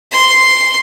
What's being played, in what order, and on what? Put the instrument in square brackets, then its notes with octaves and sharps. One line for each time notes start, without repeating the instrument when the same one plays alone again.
[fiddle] C6